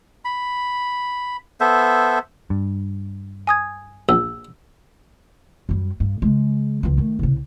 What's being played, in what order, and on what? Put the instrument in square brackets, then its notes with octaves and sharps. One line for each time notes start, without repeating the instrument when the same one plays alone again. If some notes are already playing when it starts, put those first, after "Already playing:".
[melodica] B5
B3 A4 C5 E5
[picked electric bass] G2
[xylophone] G#5 D#6 G#6
[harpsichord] A#1 [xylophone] E6
[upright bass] F#2 G3
G2
C#3 G#3
C#2 F3
D#3 A3
C2 C#3